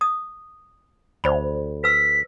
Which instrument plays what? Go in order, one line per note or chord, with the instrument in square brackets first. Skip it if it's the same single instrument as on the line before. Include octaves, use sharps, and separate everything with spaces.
[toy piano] D#6
[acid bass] D2 [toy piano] C5 D5 B5
[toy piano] B4 E6 [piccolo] B6